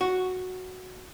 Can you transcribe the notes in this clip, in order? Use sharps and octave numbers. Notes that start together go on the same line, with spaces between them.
F#4